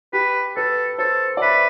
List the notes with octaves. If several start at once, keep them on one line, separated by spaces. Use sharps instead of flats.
G4 B4
A4 B4
A4 C5
D5
B4 E5